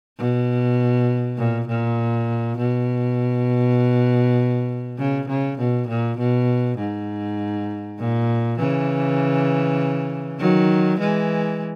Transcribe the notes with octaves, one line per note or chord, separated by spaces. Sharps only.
B2
A#2
A#2
B2
C#3
C#3
B2
A#2
B2
G#2
A#2
C#3 E3
D#3 F#3
E3 G#3